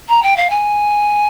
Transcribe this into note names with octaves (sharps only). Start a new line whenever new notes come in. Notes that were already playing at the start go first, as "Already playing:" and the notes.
A#5
G5
F5
G#5